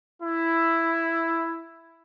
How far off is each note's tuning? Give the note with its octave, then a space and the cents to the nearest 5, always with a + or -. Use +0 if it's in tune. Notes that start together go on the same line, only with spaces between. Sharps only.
E4 +5